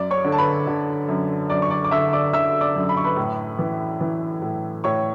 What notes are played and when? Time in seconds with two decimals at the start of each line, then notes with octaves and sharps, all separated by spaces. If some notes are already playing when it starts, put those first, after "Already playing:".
Already playing: F#2 D5 D6
0.11 C#5 C#6
0.25 D3
0.32 A5
0.38 B4 B5
0.67 D3
1.08 F#2
1.50 F#2 D5 D6
1.62 C#6
1.71 D5 D6
1.85 D6
1.91 D3 E5 E6
2.13 D5 D6
2.33 D3 E5 E6
2.61 D5 D6
2.76 F#2
2.89 B5
2.97 C#6
3.04 B4 B5
3.17 A2
3.59 E3
4.01 E3
4.42 A2
4.84 A2 C#5 C#6